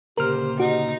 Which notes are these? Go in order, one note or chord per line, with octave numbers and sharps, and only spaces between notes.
D2 A#2 C#3 G4 A#4 C5 F6
D#4 F#4